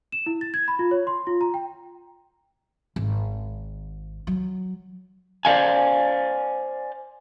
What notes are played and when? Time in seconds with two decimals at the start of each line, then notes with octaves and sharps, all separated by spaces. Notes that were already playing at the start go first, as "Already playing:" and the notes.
0.12 E7
0.26 E4
0.41 A6
0.54 G#6
0.68 B5
0.79 F4
0.91 C#5
1.07 C6
1.27 F4
1.41 A#5
1.54 G5
2.96 G#1
4.27 F#3
5.45 C5 D5 D#5 F5 G#5